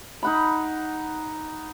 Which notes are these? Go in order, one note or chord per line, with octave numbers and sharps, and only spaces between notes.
D#4 F#5 B5